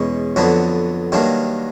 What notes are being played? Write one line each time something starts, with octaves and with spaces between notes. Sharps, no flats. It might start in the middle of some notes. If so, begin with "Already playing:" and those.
Already playing: E2 B2 G#3 C#4
F2 D3 F#3 B3 D4
G2 D#3 F#3 A#3 D4